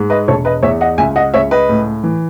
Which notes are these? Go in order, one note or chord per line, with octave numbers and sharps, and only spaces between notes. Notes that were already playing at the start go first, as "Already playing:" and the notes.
Already playing: G#2
B4 D#5
E1 A4 C#5
B4 D#5
E2 C#5 E5
D#5 F#5
C#2 E5 G#5
D#5 F#5
C#2 C#5 E5
B4 D#5
A2
E3